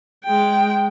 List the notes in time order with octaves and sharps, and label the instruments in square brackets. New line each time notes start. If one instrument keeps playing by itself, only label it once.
[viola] G#3 G5